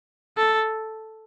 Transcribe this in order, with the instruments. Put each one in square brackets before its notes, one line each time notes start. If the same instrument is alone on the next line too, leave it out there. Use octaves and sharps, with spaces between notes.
[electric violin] A4